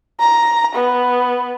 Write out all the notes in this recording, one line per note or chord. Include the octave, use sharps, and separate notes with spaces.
A#5
B3